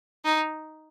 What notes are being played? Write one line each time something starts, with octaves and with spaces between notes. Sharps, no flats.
D#4